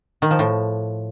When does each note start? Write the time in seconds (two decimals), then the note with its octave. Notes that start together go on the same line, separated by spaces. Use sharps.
0.22 D#3
0.31 F3
0.39 A2